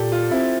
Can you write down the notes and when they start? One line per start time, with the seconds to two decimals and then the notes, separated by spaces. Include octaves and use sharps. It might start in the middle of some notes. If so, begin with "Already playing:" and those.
Already playing: A#2 G4 A4
0.12 F4
0.31 C4 E4